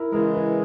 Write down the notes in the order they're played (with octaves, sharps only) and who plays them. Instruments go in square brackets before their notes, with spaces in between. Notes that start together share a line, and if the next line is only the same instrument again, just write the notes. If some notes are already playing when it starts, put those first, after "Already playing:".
Already playing: [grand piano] E4 A#4
[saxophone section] C#3 E3 G#3 [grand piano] A#4
[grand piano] B4